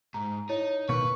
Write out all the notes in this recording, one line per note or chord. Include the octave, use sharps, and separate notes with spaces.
G#2 A#5
D#4 E4 C#5
B2 D#3 A#3 B4 C#6